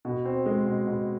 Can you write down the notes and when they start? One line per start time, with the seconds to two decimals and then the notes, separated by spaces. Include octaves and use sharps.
0.05 B2
0.25 C4
0.46 G#3
0.66 B2
0.87 B2